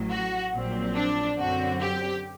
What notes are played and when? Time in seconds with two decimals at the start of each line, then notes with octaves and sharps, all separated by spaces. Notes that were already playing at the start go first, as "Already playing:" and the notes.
Already playing: A1 A2 F#3
0.11 F#4
0.53 A#1 A#2 F#3 C4
0.96 D4
1.39 F#2 D3 F#3 C4 F#4
1.81 G4